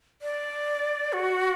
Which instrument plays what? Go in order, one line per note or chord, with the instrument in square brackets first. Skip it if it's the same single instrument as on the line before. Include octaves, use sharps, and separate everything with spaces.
[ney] D5
F#4